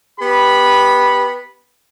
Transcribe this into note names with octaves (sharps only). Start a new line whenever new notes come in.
B3 G4 B5